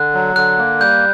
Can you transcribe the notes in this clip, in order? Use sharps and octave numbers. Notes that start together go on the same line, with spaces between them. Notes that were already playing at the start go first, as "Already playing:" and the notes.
Already playing: D3 F#6
F#3
D3 F#6
A#3
G3 G6